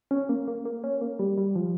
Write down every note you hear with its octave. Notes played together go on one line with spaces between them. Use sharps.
C#4
A#3
A#3
A#3
C#4
A#3
G3
G3
F3